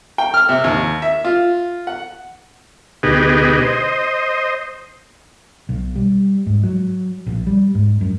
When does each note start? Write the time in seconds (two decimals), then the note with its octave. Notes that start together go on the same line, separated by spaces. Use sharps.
0.18 G5
0.34 F6
0.49 C3
0.64 D#2
1.02 E5
1.25 F4
1.87 F#5
3.03 D2 B2 D#4 G4 G#4 B4
3.62 C5 D#5
5.69 B1
5.96 G3
6.46 G#2
6.63 F#3
7.26 A#1
7.47 G3
7.75 G#2
8.01 F#2